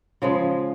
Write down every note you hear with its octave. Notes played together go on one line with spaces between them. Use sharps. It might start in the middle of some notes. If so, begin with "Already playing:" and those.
C#3 F3 G#3